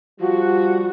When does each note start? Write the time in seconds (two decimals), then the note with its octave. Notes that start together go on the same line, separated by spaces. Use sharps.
0.20 F3 G3 F#4